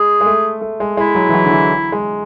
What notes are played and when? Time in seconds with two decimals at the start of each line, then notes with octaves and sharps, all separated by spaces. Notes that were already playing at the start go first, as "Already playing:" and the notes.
Already playing: G#3 G#4
0.21 G#3
0.26 A3
0.61 A3
0.80 G#3
0.97 G#3 E4
1.15 F#3
1.29 E3
1.34 F#3
1.45 D3
1.51 E3
1.92 G#3